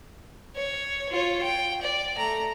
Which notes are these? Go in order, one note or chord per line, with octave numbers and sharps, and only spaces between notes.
C#5
F4 C#5
G5
D5
A3 A#5